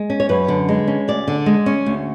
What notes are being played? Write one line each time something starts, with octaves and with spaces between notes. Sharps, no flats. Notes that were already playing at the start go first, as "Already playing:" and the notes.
Already playing: G#3
C#4
C#5
F#2 B4
D3
G#3
C#4
D2 D5
D3
G#3
C#4
D2